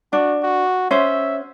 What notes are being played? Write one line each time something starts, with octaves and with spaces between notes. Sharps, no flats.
D4 F#4
F#4
C#4 C5 E5